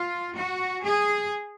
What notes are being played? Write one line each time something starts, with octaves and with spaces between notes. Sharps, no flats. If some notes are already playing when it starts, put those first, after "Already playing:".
Already playing: F4
F#4
G#4